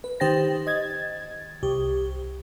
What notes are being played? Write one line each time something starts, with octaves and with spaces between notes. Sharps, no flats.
B4
D#3 G4 C5 G5 A6 A#6
D#5 G#6 A6
C2 G4